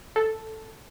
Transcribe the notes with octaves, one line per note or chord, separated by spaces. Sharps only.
A4